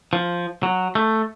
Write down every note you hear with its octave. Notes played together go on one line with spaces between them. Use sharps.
F3
F#3
A3